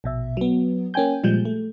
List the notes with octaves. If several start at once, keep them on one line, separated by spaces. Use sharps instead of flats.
A#1 B2 E5
F#3 B3
A#3 C#4 G5 G#5 G6
A#2 F3 G3 G#3 G6
A3